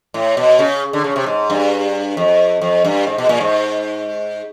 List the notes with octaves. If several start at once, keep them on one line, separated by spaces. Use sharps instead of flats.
A2
B2
C#3
D3
C#3
C3
G#2
G2
F2
F2
G2
G#2
B2
A#2
G#2